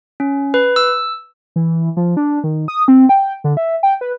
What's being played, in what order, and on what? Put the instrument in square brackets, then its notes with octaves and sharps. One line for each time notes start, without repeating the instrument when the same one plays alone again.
[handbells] C#4
B4
E6
[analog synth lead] E3
F3
D4
D#3
D#6
C4
G5
D3
E5
G5
B4